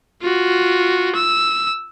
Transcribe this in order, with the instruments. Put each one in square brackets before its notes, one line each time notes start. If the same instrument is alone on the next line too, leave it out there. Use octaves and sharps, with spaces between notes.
[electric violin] F4 F#4
E6